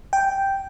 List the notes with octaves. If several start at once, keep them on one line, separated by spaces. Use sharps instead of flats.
G5